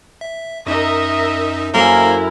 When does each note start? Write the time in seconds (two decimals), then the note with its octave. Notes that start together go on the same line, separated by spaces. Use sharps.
0.21 E5
0.66 F#2 D#4 A#4 D#5 E5
1.74 F#2 A#3 E4 A4 A#4 C5